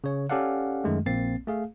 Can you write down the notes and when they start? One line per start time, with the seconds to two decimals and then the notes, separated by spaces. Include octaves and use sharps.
0.04 C#3 C#5
0.30 C#4 G4 A4 D5 F5 F#5
0.84 F#2 D#3 G#3 A3
1.06 A#1 A#3 C4 A6 C7
1.47 A3 G#4 F5